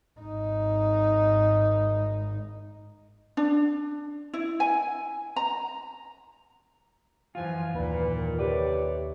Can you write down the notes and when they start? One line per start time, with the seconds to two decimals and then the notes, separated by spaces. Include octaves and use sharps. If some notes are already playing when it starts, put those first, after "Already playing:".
0.20 G#1 D#4
3.37 D4
4.33 E4
4.60 G#5
5.36 A#5
7.35 F#2 E3 F3 F4 G#5
7.75 D#2 A#2 B4
8.16 D#3
8.38 C3 A4 B4 C#5 D5 G5